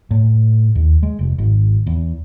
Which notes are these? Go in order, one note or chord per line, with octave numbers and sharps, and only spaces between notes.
A2
D#2
G#3
F1
G#1
E2